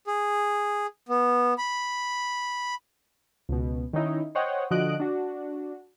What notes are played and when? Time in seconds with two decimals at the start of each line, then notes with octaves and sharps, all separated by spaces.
0.07 G#4
1.09 B3
1.58 B5
3.49 C#2 B2
3.93 D#3 C#4 D#4 E4
4.35 C5 C#5 D#5 F#5 G5
4.71 D3 F3 F#4 D#5 F#6 D7
5.00 D4 F#4